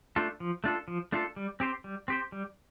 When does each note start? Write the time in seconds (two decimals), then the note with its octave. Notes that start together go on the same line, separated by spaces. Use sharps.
0.16 A3 D4 F4 A4
0.40 F3
0.64 A3 D4 F4 A4
0.88 F3
1.12 A3 D4 F4 A4
1.36 G3
1.60 C4 G4 C5
1.84 G3
2.08 C4 G4 C5
2.32 G3